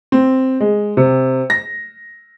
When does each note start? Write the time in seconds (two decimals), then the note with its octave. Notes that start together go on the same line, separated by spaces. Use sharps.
0.12 C4
0.60 G#3
0.97 C3
1.50 A#6